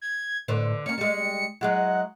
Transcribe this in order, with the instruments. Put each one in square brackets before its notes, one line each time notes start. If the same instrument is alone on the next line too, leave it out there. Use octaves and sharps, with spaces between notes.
[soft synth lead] G#6
[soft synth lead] A2 [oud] D3 B4 C5
[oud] A#3 C#4 [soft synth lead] C#7
[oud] G3 G#3 [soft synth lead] C#7
[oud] F#3 G#3 E4 [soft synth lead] F#5